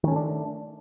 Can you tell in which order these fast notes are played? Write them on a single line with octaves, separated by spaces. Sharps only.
D#3 C#4 A3 D4